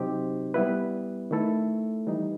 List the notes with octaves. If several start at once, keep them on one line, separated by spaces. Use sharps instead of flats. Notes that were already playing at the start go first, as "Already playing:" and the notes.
Already playing: C3 F#3 C4 D#4 G4
G3 B3 E4 B4
D#3 A3 E4 A4
E3 G3 D#4